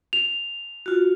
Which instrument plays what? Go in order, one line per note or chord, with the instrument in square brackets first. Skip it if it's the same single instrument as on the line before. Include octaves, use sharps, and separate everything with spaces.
[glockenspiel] F7
[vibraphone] F4 F#4